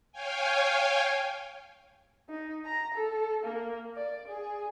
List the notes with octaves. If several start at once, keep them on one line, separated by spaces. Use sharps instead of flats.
C#5 F5 G5 G#5
D#4
A#5
A4
A#3
D5
G#4